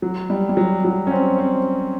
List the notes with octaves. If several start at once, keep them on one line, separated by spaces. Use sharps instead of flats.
F#3
G3
G3
F#3
F#3
C#4
C4
C4